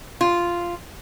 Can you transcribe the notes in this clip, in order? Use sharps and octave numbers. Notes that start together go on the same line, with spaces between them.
F4